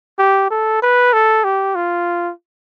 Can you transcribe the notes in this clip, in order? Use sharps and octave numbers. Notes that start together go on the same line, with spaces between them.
G4
A4
B4
A4
G4
F4